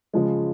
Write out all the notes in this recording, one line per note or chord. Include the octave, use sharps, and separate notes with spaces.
C#3 F3 G#3